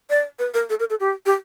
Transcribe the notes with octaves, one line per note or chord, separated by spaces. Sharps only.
D5
B4
A#4
A4
A#4
A4
G4
G4